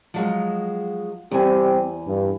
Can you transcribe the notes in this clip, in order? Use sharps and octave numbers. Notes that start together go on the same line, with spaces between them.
F3 F#3 G#3
E2 G3 C4 G4 G#5
G2